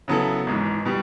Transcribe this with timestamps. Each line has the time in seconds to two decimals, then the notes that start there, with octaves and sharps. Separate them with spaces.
0.08 C#3 F#3 B3 E4 A4
0.47 G#1 G#2 E3
0.85 B2 G3